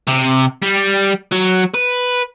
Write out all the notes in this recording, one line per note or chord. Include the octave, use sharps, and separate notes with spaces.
C3
G3
F#3
B4